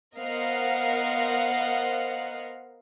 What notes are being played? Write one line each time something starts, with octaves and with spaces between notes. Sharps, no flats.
B3 A#4 C5 D#5 F5 F#5